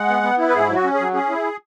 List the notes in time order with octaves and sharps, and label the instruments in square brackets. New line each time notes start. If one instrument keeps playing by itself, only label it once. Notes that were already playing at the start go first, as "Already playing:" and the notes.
Already playing: [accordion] G#3 F#5
B3
B3
E4
B4
G#2 G#4
F#3
F#4
C#4
F#3 G#4
C#4 G#4
E4